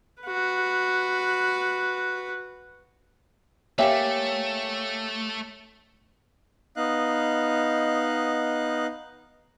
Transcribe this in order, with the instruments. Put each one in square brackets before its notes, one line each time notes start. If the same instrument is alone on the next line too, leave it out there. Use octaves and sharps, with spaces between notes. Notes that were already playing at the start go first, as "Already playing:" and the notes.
[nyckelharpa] F#4 B4
[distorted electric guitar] A3 [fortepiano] A#3 G4 E5 [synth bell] C#5 [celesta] F5 G5 G#5
[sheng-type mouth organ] B3 D#4 D#5 F5 F#6